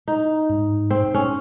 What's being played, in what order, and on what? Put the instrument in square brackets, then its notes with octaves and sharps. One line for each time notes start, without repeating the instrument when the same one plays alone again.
[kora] D#4
[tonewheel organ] G#2
[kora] C4
C#4